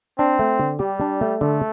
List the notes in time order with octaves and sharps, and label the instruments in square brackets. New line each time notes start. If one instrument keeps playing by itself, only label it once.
[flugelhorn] C4 [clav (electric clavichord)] D4
[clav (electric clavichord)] A3
D3
[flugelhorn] G3 [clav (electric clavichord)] G4
[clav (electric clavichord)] D4
A3
[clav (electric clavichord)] D3 [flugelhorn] A3